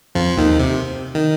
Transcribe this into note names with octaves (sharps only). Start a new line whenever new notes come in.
F2 F3
D#2 D#3
C3
D#3